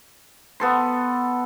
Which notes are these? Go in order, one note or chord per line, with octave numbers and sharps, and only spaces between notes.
B3 A4 C6